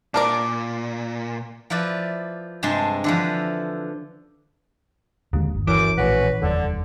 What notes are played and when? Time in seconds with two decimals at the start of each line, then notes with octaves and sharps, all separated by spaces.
0.14 A#2 D4 A#4 D5
1.70 F3 E4 B4 D5
2.63 G2 C3 G#3 A5 C6
3.04 D3 E3 F3
5.33 D1 D#2 D3 G#3
5.55 G1
5.67 F#2 E3 D6
5.97 A#1 A2 C#4 F#4 B4
6.42 F1 D#2 D3 G3